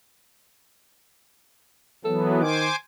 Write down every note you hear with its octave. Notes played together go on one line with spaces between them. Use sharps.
E3 F#3 B3 A4
D#3 C5 G#5 D6